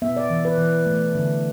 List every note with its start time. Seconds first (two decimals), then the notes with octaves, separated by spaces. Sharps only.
0.02 B3 E5
0.17 D5
0.30 E3
0.45 B4
0.58 E3
0.86 A3
1.15 D3